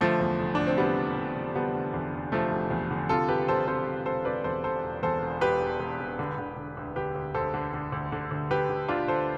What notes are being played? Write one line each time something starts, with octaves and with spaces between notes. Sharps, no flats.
D3 F3 A3
E2
F1
D3 D4
C4
F1 G3 B3
F1
F1
F1
D3 G3 B3
D3
E2
F1
F1 F3 A3
F1
E2
D3
C3 F4 A4
E1 G4 B4
E1 A4 C5
C3 A4 C5
E1
E1 A4 C5
C3 B4 D5
E2 A4 C5
E1 A4 C5
E1
E2 A4 C5
E1
E1 G4 B4
E1
E1
E1
D3
D3
D3
D2
D3 G4 B4
D2
D2 A4 C5
D3
D3
D2
D3
D2
D3 G4 B4
D3
D2 D4 F4
D2 A4 C5